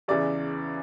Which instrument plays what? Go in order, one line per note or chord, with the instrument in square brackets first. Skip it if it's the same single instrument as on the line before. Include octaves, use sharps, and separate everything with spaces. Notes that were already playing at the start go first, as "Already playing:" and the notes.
[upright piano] E2 C#3 E3 D5